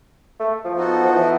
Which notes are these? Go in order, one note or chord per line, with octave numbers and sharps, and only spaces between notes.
A3
F3
B3 D#4 F#4 A4
F3
E3